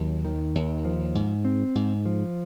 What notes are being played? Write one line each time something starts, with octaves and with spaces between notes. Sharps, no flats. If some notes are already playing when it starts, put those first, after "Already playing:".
Already playing: D#2 F#3
D#3
D#2
F3
G#2
C4
G#2
F3